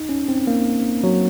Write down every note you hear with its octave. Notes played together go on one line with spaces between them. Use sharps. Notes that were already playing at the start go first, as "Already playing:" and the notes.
Already playing: D#4
C#4
C4
A#3
F#3